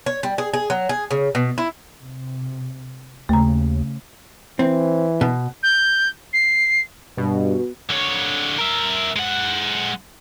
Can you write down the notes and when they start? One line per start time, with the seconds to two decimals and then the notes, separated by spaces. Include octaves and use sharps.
0.06 C#5
0.23 G3
0.38 G#4
0.53 G#4
0.70 F#3
0.89 G#4
1.11 C#3
1.35 B2
1.58 E4
1.98 C3
3.29 D#2 C#3 A3 A#5
4.59 E3 C4
5.21 B2
5.63 G6
6.33 C7
7.18 G2 B2
7.89 D3 C#5
8.59 A#4 E5
9.16 G#3 F#5